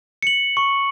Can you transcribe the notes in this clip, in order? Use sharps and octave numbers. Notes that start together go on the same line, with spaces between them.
C#7 F#7
C#6